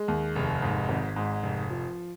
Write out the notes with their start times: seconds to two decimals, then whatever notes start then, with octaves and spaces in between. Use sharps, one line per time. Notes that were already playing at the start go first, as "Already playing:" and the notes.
Already playing: G#3
0.08 D#2
0.36 F1
0.62 G#2
0.89 G#1
1.16 G#2
1.43 F1
1.70 F3